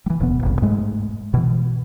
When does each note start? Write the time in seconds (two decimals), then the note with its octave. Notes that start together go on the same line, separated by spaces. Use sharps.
0.06 E3 G3
0.20 D1 E2 B2 B3
0.43 F#1 C2
0.62 G#2 G#3 A3
1.34 B2 E3